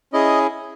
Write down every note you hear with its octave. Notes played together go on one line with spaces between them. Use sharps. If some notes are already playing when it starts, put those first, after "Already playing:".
C#4 E4 G#4 D#5